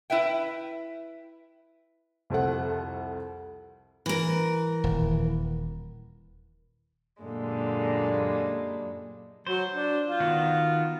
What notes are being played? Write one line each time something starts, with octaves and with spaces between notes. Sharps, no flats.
E4 B4 E5 G5
C2 F2 A4 F#5
E3 A#4
D#1
F#2 A#2 D3 G3 G#3
F#3 C5
D4
F4
D#3 B3 F#4